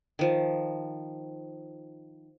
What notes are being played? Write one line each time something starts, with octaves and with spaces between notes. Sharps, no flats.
D#3 F3